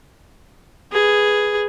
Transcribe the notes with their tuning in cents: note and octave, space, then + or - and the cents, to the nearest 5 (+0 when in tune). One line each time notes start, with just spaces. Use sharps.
G#4 +0 B4 +0